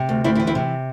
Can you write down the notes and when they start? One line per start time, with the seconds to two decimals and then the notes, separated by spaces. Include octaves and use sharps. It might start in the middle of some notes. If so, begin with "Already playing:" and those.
Already playing: C3
0.09 D2
0.24 D2 C4 E4
0.35 C4 E4
0.40 E3
0.47 C4 E4
0.55 C3